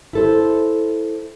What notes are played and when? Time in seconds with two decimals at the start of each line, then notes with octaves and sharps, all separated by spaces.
0.13 E4 A4 C5